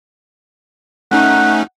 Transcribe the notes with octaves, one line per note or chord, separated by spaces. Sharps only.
A3 C#4 D#4 F#5